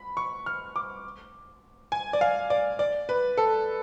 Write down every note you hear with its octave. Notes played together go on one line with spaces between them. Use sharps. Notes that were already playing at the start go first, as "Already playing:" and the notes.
Already playing: B5
C#6
F6
D6
G#5
D5
F5
D5
D5
B4
A4